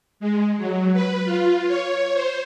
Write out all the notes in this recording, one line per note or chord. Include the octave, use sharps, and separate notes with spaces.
G#3
F#3
B4
F4
C#5
C5